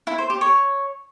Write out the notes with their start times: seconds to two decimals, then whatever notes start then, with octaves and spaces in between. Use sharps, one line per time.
0.07 E4
0.18 C5
0.30 G4
0.41 C#5